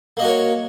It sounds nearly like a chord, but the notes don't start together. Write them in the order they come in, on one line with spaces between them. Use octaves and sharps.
A#3 D#5 F#4 A#4 C#5